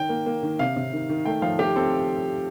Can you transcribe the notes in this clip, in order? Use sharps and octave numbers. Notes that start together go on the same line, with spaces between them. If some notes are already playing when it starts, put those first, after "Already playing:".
Already playing: D#3 G5
A#3
A#3
D#3
C3 F5
C3
D#3
D#3
A3 G5
F3 F5
A3 G4
C4 A4